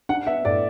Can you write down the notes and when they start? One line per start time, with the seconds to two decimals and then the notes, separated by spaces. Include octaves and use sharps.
0.09 D4 F#5
0.27 B3 E5
0.45 A2 D5